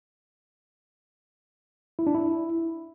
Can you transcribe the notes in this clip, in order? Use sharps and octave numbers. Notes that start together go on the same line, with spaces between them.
E4
D4
E4